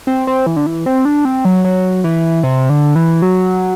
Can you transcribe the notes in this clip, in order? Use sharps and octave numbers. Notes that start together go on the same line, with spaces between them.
C4
C4
E3
D3
E3
C4
D4
C4
F#3
F#3
E3
C3
D3
E3
F#3